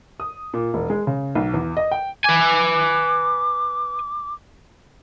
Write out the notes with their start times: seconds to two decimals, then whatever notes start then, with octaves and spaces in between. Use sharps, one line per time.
0.20 D#6
0.54 A#2
0.74 E1
0.90 G#3
1.07 C#3
1.35 B1
1.54 E2
1.77 D#5
1.91 G5
2.25 B4 G#5 D6